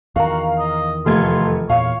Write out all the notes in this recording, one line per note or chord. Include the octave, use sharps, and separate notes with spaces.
E2 D#3 F#4 F5 A#5
D#5
F1 A3 F4 G#6
E2 A#2 C#5 F5